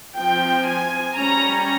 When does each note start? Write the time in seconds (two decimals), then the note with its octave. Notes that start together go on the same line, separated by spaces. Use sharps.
0.17 F3 C4 G5
0.67 G#5
1.18 G3 C#4 A#5